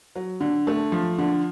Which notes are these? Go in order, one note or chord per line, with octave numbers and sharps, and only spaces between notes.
F#3
D3
A3
F3
D3